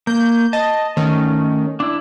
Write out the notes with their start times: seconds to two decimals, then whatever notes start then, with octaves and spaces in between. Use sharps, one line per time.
0.07 A#3 G6
0.53 D#5 A5
0.97 D#3 A3 C#4
1.80 D4 E4